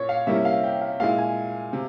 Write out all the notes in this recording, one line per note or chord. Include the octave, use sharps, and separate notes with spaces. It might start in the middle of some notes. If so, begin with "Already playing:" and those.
Already playing: A#2 C#4 C#5
F5
C3 G3 A#3 C#4 E4 E5
F5
G5
F5
A#2 G#3 E4 F5
G#5
C3